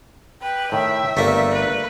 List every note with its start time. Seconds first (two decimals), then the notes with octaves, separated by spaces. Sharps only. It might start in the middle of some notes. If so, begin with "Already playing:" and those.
0.42 B4 G5
0.72 A2 D#3 E5
1.17 G1 A3 A#3 D5
1.52 B4